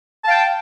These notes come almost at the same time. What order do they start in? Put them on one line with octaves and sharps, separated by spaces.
A5 F5 G5